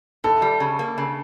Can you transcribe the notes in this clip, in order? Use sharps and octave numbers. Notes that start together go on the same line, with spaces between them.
E2 A4
G3
C#3
A#3
C#3